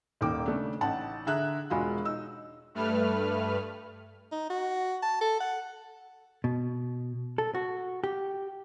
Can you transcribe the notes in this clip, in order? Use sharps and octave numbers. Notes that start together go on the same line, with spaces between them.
D#1 D#3 A#3 G5 D6
C#3 A3 D4
A1 D#4 F#5 A5
D3 G#4 E5 A#5 F#6
E1 G#3 F4 F#4 F5 B5
D#4 E6
G2 A3 B4 F6
D#4
F#4
A5
A4
F#5
B2
A4
F#4
G4